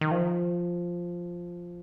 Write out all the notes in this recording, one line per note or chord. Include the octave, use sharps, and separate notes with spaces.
D#3
F3